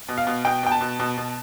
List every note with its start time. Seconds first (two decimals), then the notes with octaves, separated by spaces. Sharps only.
0.09 B2
0.18 F5
0.27 B2
0.45 B2 G5
0.63 B2 G5
0.72 A5
0.81 B2
0.99 B2
1.17 B2